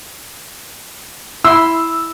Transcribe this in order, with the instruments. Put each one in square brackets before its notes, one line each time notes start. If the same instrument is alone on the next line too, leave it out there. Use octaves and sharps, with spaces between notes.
[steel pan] E4 C6 [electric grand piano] E6